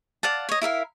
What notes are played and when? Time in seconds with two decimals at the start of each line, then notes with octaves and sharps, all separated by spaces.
0.23 D5 F5 F#5 A5
0.49 C#5 D#5
0.62 E4 A#4 E5 F5